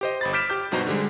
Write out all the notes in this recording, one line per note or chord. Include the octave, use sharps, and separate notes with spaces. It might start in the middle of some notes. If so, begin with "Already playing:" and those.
G4 C5 D#5
G1 B5 A6
D6 F6 G6 B6 D7 E7
G4 D6 G6
G2 B2 F#3 D#4 C5 A#5
D3 G3 G#3